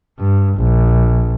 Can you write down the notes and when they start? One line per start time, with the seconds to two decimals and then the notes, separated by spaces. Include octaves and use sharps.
0.19 G2
0.58 A#1